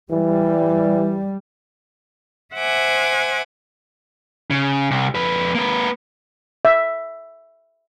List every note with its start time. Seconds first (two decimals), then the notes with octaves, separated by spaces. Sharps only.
0.11 E3 G3
2.55 C5 E5 F#5 G#5 D6
4.50 C#3
4.91 C2
5.15 F2 B4
5.55 A#3 B4
6.65 E5